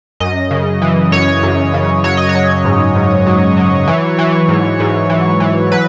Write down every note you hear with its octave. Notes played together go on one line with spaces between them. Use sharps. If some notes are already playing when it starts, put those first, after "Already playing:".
F#2 D#5
C#3
E3
F#2 C#5
F#2
C#3
F#3 C#5
D#5
C#5
F#3
G#2
G#2
F#3
F#3
E3
E3
G#2
G#2
E3
E3
F#3 B4